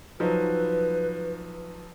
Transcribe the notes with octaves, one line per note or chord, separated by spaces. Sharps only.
F3 F#3 D#4 B4